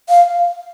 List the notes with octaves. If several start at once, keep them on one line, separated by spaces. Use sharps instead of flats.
F5